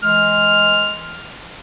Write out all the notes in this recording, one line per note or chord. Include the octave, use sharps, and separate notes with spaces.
E3 G#3 F6